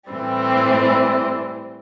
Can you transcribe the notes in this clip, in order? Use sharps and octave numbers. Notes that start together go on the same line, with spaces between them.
A2 E3 G3 C4